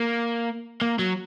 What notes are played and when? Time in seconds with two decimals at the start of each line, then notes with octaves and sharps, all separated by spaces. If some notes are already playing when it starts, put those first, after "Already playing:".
Already playing: A#3
0.82 A#3
0.99 F#3